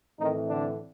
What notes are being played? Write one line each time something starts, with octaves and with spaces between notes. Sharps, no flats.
A2 D#3 E3 A3 C4 D#4
D3 D4